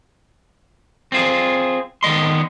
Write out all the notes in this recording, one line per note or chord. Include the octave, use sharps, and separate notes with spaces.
C4 F4 G#4
D#3 B3 D#5 C6